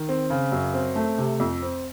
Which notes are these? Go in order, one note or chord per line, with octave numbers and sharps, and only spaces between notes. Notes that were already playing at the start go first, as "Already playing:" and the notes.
Already playing: D#3
C4
C#3
F#2
C4
A3
C3
F2
C4